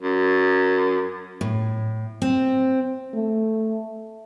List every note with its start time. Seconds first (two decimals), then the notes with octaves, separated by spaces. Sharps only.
0.02 F#2
1.41 A2
2.22 C4
3.14 A3